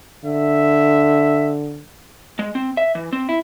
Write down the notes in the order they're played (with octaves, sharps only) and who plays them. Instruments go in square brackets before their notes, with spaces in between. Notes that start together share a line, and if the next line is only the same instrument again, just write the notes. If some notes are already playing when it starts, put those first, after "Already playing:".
[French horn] D3 [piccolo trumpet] E5
[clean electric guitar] G#3
C4
E5
E3
C4
E4